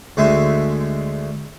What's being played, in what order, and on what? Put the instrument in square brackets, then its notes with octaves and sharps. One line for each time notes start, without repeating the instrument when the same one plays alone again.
[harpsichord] D2 G#3 A3 E5 G#5 C6